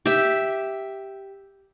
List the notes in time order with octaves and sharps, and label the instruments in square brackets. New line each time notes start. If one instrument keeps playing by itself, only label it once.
[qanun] G4 E5